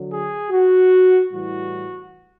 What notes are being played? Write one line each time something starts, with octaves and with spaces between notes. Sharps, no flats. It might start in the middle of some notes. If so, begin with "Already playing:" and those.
Already playing: D3 F#3
G#4
F#4
A2 E3 G3 F#4